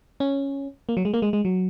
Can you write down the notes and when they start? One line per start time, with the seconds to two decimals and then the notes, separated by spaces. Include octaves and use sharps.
0.20 C#4
0.89 A#3
0.97 F#3
1.05 G#3
1.14 A#3
1.22 G#3
1.33 G#3
1.45 F#3